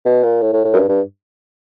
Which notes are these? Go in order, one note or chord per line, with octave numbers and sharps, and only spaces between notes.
B2
A#2
A2
A2
A2
F#2
G2
G2